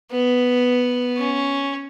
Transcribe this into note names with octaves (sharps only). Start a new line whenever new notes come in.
B3
C#4